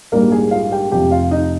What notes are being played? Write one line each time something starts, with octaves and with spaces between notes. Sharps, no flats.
A#1 G#2 G3 A#3 A#4
G#4 G#5
F4 F5
G4 G5
F1 F2 C3 F3 G4 G5
F4 F5
D#4 D#5